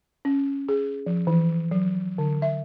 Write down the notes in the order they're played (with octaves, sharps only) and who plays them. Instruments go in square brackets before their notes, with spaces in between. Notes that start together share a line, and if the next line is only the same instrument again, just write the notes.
[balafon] C#4
G#4
F3
E3
F#3
D3
E5